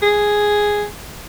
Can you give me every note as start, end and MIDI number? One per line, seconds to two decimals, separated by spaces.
0.02 0.84 68